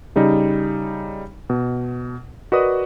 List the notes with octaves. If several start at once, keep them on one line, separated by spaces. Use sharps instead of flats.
C#3 G3 D#4
B2
F#4 A#4 B4 D5 D#5 D#6